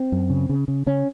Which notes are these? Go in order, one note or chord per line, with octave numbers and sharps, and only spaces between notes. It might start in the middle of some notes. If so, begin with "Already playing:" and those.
Already playing: C4
F#2
C#3
C#3
C#3
C#3 C#4